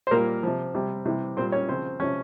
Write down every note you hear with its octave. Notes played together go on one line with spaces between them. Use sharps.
C5
A#2 G3 A#3 A#4
C3 F3
C3 G3
C3 E3 G3
A#2 G3 C4 C5
C#4 C#5
C#3 F3 C4 C5
C3 F3 C#4